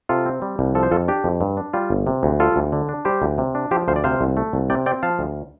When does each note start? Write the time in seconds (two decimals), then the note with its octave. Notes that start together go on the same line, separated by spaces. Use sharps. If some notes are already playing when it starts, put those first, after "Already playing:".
0.09 C3 F4 A4
0.26 C4
0.42 G3
0.59 C2
0.75 F3 A4
0.83 C5
0.91 F2 F4 A4
1.08 D4 G4
1.24 F2
1.41 G2
1.57 D4
1.73 G3 F4
1.90 G1
2.07 C3
2.23 D2
2.39 G3 F4 A4
2.56 D2
2.73 D3
2.89 D4
3.05 G3 G4 C5
3.22 D2
3.38 C3
3.55 D4
3.71 F3 G4 C5
3.88 D2 C5 F5
3.96 D5
4.04 C3 C5 F5
4.21 C2
4.37 A3
4.53 C2
4.70 C3 D5 G5
4.86 C4 D5 G5
5.03 F3 F5 A5
5.19 D2